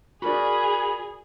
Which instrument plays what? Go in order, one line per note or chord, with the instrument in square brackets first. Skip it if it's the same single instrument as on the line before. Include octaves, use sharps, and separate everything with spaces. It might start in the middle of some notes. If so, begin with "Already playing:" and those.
[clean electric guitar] F#4 A#4 D5 [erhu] G#4 [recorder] B5